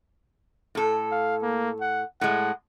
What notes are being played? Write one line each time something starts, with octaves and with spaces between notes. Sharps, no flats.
A2 A4
F5
A#3
F#5
A2 G#3 F#5